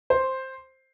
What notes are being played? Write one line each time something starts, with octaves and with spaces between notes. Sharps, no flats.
C5